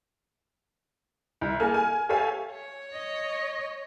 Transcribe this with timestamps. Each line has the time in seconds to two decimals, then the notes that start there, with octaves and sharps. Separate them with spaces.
1.41 C2
1.60 A#3 G#4 A4 G#5 F6
1.74 G#5
2.09 G4 A4 C#5 E5 F5 G#5
2.52 C#5
2.93 D#5